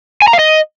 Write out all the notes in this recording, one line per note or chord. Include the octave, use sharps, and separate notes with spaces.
G#5
A#5
F5
D#5